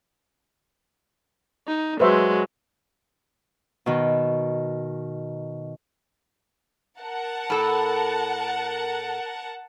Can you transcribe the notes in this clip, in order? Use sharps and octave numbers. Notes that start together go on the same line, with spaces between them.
D#4
F#3 G#3 B4 C5 E5
B2 D#3
A#4 F#5 A5
A2 A4